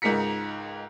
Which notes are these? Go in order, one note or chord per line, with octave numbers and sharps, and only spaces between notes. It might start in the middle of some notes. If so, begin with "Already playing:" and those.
C#2 G#2 D#4 A#4 B6 C#7